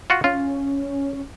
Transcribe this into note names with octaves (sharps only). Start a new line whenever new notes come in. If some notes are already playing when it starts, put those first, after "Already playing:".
F4 F#4 F#5
C#4 F4